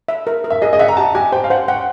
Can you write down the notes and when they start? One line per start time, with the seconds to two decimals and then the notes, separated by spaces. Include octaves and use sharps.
0.08 E5
0.27 A#4
0.44 A#4
0.50 E5
0.62 G#4 D#5
0.73 D#5
0.79 E5 F#5
0.88 A#5
0.97 G4 A5
1.15 G4 G#5
1.32 C5 G5
1.44 F5
1.50 C5 F#5
1.68 F#5 G5